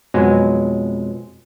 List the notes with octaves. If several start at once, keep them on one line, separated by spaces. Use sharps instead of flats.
F2 B2 F#3 G#3